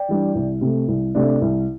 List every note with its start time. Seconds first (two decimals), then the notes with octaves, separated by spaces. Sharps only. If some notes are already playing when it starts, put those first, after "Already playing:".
Already playing: D5 G5
0.08 E3 G3 D4
0.35 C2
0.61 C3 A3
0.88 C2
1.15 C3 A3 D4
1.42 C2